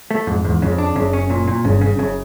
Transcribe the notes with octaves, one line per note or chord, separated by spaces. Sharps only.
A3
F2 G#2
E2 G#2
F2 C#3
D4
F#1 F#2 C#3
C#4
A#2
A#2
G1 G2 C#3
C#3
F#1 F#2 C#3